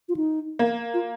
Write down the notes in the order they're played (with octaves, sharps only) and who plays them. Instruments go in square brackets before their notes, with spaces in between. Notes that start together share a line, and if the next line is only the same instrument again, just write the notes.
[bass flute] F4
D#4
[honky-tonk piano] A#3
[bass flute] F4